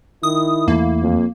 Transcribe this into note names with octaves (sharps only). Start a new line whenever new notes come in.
D#3 E4 D#6
E2 E3 A3 A#3
F2